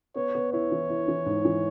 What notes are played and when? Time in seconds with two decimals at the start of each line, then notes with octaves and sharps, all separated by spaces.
0.16 B3 C#5
0.35 B3
0.53 E4 C#5
0.71 E3
0.90 E4
1.08 E3
1.26 G#2
1.45 E3